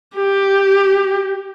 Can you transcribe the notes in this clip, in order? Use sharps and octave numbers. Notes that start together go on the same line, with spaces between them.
G4